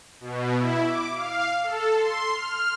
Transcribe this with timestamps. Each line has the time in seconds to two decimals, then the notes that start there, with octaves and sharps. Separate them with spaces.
0.20 B2
0.55 E4
0.84 D6
1.15 F5
1.64 A4
1.95 C6
2.32 F6